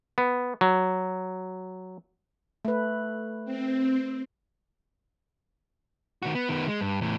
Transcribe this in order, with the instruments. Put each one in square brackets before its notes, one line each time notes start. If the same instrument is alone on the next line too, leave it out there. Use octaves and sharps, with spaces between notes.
[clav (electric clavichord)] B3
F#3
[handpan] A3 B4
[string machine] C4
[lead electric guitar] D#3 F#4
B3
D#3 B3
G#3
G2
E2 A2